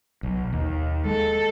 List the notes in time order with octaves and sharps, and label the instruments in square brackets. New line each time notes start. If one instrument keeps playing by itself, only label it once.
[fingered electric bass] B1
D#2
[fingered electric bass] G#3 [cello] A4